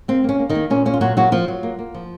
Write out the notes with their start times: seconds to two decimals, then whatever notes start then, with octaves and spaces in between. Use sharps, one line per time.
0.08 A#3 C4
0.24 A#3 C#4
0.39 A#3
0.49 D#3 D#4
0.55 A#3
0.70 A#2 C#4
0.86 A#3 C#4
0.94 F4
1.01 A#2 F#3 F#4
1.17 F#3 A#3 F#4
1.32 F3 A#3 F4
1.48 F#3
1.63 A#3
1.79 A#3
1.94 F3